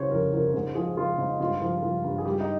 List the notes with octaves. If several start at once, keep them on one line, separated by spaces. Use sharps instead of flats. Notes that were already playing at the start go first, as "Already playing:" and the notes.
Already playing: C2 C#3 G3 C5 C#5
F2 A#4
F2 A#4
A#4
G#2 G#4
F3 G#4
F3 F4
G#2 D#4
G2 F4
F3
F3
G2
G#4
G3 G4
D#4